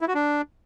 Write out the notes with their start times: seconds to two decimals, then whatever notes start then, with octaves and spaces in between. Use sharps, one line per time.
0.01 E4
0.08 F#4
0.15 D4